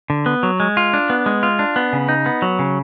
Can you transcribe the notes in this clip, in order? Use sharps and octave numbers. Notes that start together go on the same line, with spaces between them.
D3
B3
F#3
G#3
F4
D4
B3
G#3
F4
D4
B3
C#3
D#4
B3
F#3
C#3